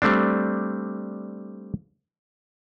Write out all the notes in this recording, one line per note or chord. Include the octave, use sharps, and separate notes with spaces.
G3 A3 C4 D4